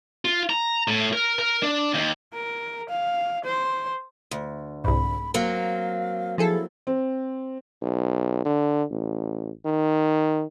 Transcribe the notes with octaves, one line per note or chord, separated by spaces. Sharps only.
F4
A#5
A2
A#4
A#4
D4
D#2
A#4
F5
C5
D2
C2 G#2 B5
F#3 A#3 C4 F5
F3 E4 G#4 A4
C4
B1
D3
A1
D#3